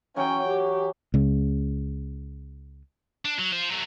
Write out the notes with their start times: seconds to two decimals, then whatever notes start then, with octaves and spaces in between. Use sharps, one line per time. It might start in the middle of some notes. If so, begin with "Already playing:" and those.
0.16 E3 F#3 C#4 G5
0.48 G4
1.14 C#2 C#3
3.25 D4
3.39 F#3
3.52 F4 C5
3.70 F#3 A3